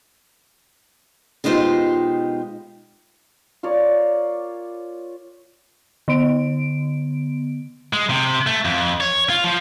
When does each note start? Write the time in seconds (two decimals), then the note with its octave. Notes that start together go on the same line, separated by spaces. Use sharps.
1.44 B2 G#3 D#4 F4 G4 C5
3.63 F4 A#4 C#5 D5
6.08 D3 B3 D7
7.93 G#3
8.10 C3
8.47 A3
8.65 F2
9.01 C#5
9.30 F4
9.44 F3